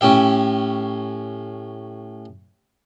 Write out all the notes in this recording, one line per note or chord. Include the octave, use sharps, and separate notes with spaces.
A2 C#4 G4 E5